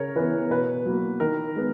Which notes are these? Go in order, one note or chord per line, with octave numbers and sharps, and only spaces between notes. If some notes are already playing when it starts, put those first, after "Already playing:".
Already playing: C#3 A#4 C#5
E3 B3 B4
B2 B4
F#3 A#3
D#3 A#4
G#3 B3